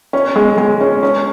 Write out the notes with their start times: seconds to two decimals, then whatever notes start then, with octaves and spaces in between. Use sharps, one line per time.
0.13 C#4
0.36 G#3
0.58 G#3
0.81 C#4
1.03 C#4